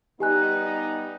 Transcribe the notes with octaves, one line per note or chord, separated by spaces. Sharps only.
G3 B3 D#4 G4 G#5 F#6